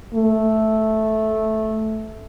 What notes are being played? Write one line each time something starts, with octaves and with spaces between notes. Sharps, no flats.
A3